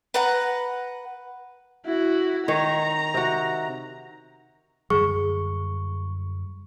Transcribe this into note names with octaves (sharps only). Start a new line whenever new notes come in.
B4 F#5 A#5
E4 F#4
D#3 C#5 A#5
C3 F#4
F#2 D3 G3 G#4 C#6